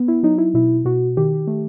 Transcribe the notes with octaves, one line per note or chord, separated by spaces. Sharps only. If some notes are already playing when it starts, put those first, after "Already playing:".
Already playing: B3
E4
F#3 D#4
E4
B2 E4
B2 F#4
D#3 G4
A3